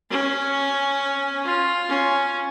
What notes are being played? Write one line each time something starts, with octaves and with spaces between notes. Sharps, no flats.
C#4
F4
C#4